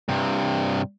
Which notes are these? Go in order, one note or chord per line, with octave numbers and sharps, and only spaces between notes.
G2 C3